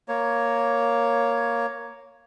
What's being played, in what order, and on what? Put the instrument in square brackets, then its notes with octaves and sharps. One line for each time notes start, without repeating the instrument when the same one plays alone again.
[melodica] A#3 C#5